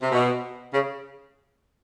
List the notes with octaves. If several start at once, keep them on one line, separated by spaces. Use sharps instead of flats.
C3
B2
C#3